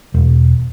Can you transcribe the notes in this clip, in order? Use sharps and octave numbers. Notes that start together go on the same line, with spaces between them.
E1